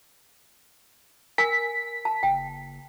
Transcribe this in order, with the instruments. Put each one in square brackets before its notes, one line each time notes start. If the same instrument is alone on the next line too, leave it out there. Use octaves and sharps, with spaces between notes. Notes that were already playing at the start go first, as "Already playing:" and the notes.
[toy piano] A#4 G#5 [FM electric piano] B6
[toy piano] A5
[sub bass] F#1 [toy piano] G5